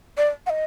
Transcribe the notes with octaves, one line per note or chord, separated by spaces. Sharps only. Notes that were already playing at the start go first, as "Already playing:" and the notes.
D5
F#5
D#5